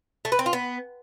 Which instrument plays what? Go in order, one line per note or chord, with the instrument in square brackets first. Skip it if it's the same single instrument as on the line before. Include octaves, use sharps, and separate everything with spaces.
[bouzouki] A3
B4
C4
F4
B3